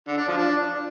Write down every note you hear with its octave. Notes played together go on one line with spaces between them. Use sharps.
D3
D4
F3
D4